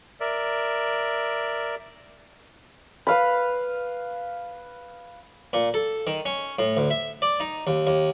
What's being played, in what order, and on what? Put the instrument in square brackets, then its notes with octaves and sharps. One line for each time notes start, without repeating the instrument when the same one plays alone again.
[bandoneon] A#4 D5 E5
[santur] B4 F5 B5
[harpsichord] A#2
A4
D#3
C#4
A2
D2
E5
D5
D#4
D#2
D#2